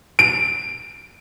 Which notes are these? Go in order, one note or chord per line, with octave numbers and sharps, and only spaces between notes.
D7